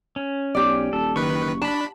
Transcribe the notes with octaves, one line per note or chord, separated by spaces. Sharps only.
C#4
B1 G4 D5
D#1 A4
F#1 D#3 B4 C#6
D4 A5 B5